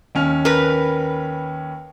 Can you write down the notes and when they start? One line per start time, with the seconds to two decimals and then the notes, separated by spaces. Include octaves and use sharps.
0.15 D#2 C#4 F6
0.45 A#4 B4